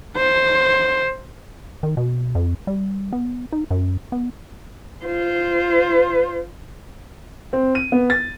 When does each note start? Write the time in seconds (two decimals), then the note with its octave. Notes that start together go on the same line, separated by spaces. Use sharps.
0.17 C5
1.83 D#3
1.97 B2
2.35 F2
2.67 G3
3.13 B3
3.52 D#4
3.71 F#2
4.12 B3
5.05 F4 C5
7.53 C4
7.75 D#7
7.92 B3
8.10 A6